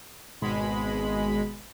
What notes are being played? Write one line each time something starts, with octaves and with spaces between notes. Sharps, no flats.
G#1 B2 G#3 B5